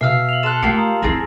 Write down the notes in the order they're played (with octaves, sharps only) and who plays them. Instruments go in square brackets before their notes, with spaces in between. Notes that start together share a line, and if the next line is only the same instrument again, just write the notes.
[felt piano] B2 [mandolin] E5 F5 [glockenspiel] E6 F6 C7
[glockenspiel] F7 F#7
[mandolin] A4 F#6 [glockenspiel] A5 C6 E7
[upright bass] A3 [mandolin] A#3 F4 G4 [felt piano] C#7
[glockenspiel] A#5 D#6
[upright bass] F2 E4 [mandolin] C4 G#4 [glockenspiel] A6 A#6